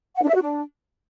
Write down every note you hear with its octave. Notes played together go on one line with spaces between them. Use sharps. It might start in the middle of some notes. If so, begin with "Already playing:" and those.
F#5
D4
E5
F#4
D4